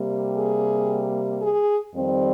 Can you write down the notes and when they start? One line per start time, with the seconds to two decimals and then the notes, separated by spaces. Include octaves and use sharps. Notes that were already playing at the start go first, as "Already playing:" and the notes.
Already playing: C3 G3 A#3
0.37 G#4
1.41 G#4
1.94 F2 D#3 G3 C4